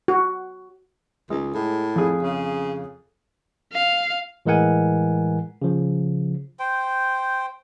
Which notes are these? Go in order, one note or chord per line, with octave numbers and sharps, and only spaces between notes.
F#4
C#2 G#3
A2
F2 G#4
C#3
F5
A2 E3 G#3 A#4 F#5 G#5
C#3 F3
C5 G5